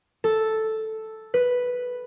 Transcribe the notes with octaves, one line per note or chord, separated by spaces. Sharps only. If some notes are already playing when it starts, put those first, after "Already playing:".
A4
B4